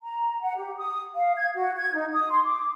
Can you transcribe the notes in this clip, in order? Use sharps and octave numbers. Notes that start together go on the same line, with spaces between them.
A#5
F#5
G4
D#6
F5
G#6
F#4
G#6
D#4
D#6
C6
D6